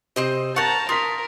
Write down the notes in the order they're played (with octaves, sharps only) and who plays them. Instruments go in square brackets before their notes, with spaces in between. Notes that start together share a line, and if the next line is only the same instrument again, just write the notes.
[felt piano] C3 [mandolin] C4 C5 D#5
[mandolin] A#4 F#5 [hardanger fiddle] A5 A#5 [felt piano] C#6 G6 A6
[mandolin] F4 [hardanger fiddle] A#4 [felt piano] D#6 B6